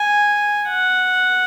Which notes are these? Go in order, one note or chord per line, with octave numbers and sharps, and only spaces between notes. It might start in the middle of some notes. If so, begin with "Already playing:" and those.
Already playing: G#5
F#5